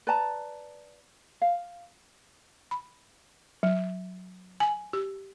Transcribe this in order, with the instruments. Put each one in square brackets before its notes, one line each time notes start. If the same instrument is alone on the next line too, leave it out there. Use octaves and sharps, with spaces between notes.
[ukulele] B4 D5 A5 A#5
F5
[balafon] B5
F#3
G#5
G4